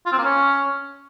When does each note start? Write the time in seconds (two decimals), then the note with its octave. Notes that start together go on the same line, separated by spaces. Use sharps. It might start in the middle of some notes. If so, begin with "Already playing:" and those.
0.06 F4
0.12 C4
0.18 A#3
0.24 C#4